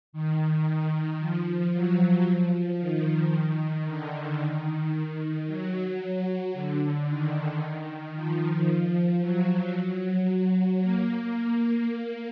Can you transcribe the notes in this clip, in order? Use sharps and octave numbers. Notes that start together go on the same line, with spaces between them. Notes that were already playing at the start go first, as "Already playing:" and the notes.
D#3
D#3
F3
F#3
F3
D#3
D3
D#3
D#3
F#3
D3
D#3
F3
F#3
A#3